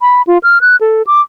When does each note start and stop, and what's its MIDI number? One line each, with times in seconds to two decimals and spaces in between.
0.01 0.22 83
0.27 0.38 65
0.43 0.61 89
0.61 0.76 90
0.81 1.02 69
1.07 1.21 86